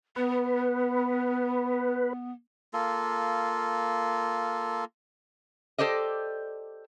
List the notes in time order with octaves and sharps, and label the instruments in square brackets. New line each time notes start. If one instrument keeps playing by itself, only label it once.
[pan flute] B3 [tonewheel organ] B4
[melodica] A#3 F4 A4
[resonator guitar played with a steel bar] G4 A4 C5 D5 D#5